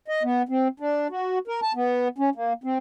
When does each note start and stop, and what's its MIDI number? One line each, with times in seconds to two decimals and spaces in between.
0.08 0.23 75
0.23 0.42 59
0.49 0.68 60
0.80 1.07 62
1.10 1.39 66
1.48 1.60 70
1.63 1.72 81
1.75 2.08 59
2.18 2.30 61
2.35 2.53 58
2.64 2.78 60